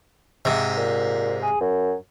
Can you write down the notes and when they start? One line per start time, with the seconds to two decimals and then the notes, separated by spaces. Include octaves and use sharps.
0.45 G#2 C3
0.77 A#2
1.42 G#4
1.61 F#2